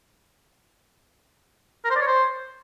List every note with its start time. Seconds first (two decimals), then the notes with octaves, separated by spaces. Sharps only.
1.85 A#4
1.90 C5
1.96 D5
2.01 C#5
2.07 C5